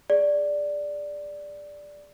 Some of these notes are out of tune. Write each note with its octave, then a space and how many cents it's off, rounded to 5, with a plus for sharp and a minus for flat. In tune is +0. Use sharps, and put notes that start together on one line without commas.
G#4 -5 D5 +0